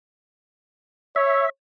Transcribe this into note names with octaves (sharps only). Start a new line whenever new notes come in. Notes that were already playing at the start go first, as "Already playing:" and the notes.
C#5 E5